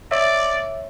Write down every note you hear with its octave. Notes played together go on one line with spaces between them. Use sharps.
C#5 D5 E5